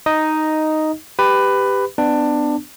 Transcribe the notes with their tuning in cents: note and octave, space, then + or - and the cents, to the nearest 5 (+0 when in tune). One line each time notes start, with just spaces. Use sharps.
D#4 +0 D#5 +0
G4 +10 B4 +15
B3 +25 D4 +15